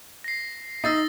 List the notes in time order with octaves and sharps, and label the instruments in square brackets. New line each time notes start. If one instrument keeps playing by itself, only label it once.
[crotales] A#6 C7
[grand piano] D#4 [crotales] E6 A6 C7